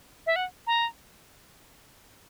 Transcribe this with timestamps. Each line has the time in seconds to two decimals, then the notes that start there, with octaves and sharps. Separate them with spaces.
0.26 E5
0.36 F#5
0.67 A#5